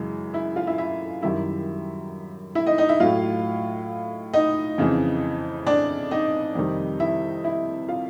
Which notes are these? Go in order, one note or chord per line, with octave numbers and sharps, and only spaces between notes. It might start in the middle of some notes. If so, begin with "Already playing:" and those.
Already playing: F#2 C#3 E3 G#3
E4 E5
F4 F5
E4 E5
E4 E5
F#2 D#3 G3 E4 E5
E4 E5
D#4 D#5
D#4 D#5
E4 E5
A2 F#3 F4 F5
D#4 D#5
F2 C#3 E3
D4 D5
D#4 D#5
F2 C3 D#3 G3
E4 E5
E4 E5
F4 F5